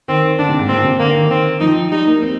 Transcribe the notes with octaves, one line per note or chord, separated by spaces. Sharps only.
D#3 C4
D3 D4
C3
G#2
A#2 C4
C3
D3 A#3
D#3
C4
F3 D#4
G3 D#4
A#3
C4